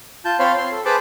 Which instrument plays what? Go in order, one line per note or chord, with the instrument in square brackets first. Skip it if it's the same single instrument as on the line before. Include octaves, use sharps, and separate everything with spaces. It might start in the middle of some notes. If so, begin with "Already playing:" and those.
[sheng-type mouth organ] F4 A5 G6
C4 C5 C#5 F5 B5 C6
C6
A4
G#4 B4 C5 A5 B5 D6